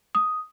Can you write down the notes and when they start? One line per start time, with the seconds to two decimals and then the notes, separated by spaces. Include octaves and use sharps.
0.15 D#6